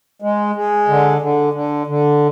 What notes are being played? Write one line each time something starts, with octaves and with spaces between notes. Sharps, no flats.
G#3
G#3
D3
D3
D3
D3